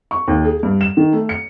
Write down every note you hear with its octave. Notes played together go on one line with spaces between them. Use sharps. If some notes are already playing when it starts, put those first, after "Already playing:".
C#6
D#2
G#4
G2
E7
D#3
A3
C#7